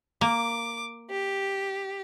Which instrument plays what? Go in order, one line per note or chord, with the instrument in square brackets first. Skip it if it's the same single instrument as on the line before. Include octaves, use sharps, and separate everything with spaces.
[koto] A#3 [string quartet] D6
[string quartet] G4